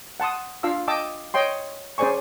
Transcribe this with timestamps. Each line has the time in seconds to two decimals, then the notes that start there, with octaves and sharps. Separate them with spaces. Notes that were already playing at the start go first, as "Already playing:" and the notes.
0.20 F#5 A5 C6 D#6
0.63 D4 F4 F5 A5 E6
0.88 D#5 G5 A5 D6 E6
1.34 C#5 D#5 G5 C6
1.98 C#4 G#4 C5 D5 G#5 C#6